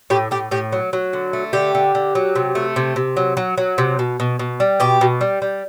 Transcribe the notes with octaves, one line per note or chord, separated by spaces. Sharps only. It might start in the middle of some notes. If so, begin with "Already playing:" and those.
A2 G4
A2 G4
A2 G4
F#3
F#3
D3
A3
D3 G4
D3
D3
F#3
C3
A3
C3
C3
F#3
F#3
F#3
C3
B2
B2
B2
G3
B2 G4
B2
G3
G3